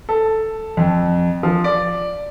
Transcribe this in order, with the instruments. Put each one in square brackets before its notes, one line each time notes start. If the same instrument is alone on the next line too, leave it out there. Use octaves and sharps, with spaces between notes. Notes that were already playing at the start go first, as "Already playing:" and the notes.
[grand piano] A4
F2
F3
D5